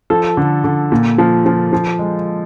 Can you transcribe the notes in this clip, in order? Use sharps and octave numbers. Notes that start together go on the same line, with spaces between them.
F3 A4
D3
D3
A#2
F3
F3
F3
G#3